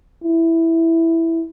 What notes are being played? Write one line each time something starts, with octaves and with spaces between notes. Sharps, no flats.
E4